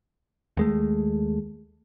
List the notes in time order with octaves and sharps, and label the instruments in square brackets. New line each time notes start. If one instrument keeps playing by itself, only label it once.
[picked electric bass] D#2 G#3 A3